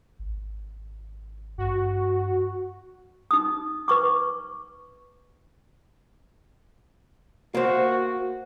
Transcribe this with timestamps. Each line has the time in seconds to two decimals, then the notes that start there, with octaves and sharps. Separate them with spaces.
0.19 G#1
1.58 G2 F#4
3.31 D#4 D#6
3.88 B4 C#6 D6
7.55 A#3 F#4 C5